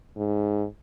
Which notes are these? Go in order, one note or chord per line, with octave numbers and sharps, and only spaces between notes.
G#2